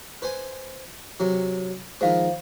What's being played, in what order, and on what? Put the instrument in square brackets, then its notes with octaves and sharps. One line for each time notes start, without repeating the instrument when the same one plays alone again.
[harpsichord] B4 C5 G#5
C3 F#3
[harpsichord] D#3 F3 G#3 [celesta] C5 F5